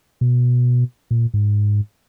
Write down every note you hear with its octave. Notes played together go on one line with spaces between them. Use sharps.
B2
A#2
G#2